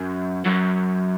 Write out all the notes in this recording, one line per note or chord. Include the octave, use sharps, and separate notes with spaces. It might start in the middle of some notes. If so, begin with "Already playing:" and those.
Already playing: F#2
F#2